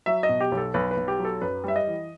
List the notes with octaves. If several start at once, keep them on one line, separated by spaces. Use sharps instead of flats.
F#3 E5
D#5
B2
G4
B1
A4
B1 B4
B4
B1
G4
F#3
A4
F#2 B4
G3 E5
D#5
E3